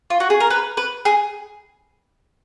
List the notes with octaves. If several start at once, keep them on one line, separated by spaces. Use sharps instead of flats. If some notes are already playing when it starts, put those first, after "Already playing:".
F4
F#4
G#4
A#4
B4
B4
G#4